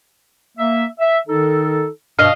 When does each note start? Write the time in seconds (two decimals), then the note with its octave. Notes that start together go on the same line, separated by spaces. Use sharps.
0.58 A#3 E5
0.99 E5
1.27 D#3 D#4 A4
2.19 G2 B2 D#5 F5